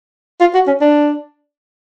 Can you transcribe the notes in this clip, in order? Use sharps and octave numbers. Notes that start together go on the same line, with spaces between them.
F4
F#4
C#4
D4